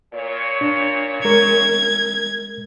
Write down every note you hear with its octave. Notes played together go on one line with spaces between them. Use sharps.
A#2 C#5
D4
G#3 A#4 G#6